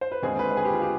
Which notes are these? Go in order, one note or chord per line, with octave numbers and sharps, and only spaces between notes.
C5
B4
D#2 D3 G#3 C4 G#4
B4
B4
G#4
G4
F4
G4